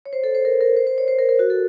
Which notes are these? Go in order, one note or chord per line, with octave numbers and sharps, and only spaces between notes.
C#5
C5
A4
C5
A#4
A#4
C5
C5
C#5
C5
A#4
A#4
F#4
A4